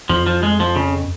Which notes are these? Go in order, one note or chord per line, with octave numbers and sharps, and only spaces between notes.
F2 F3
F3
G#3
F3
C#3